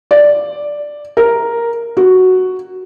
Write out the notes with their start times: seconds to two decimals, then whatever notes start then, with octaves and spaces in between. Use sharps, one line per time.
0.11 D5
1.17 A#4
1.97 F#4